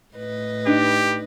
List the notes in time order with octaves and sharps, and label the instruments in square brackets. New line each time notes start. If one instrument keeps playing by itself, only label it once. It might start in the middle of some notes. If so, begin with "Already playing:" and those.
[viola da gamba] A2 B4 D#5
[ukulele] D4 D#4 [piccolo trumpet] G4